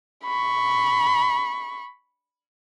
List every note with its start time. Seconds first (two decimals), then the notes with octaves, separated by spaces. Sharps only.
0.24 B5 C#6